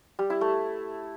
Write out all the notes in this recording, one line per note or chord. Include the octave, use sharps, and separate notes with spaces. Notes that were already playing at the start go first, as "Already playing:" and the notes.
G3
E4
A3